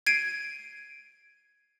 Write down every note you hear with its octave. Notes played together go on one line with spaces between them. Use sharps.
G#6 C7 D7 D#7